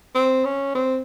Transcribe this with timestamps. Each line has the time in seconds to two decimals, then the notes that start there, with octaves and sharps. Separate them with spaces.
0.15 C4
0.45 C#4
0.75 C4